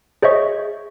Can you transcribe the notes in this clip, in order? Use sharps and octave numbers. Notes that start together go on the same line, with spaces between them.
G#4 C5 C#5 D#5 E5 C#6